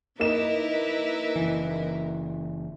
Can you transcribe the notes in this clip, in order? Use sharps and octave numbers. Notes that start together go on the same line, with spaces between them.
A#3 D#4 E4 A#4 B4 E7
F#1 E3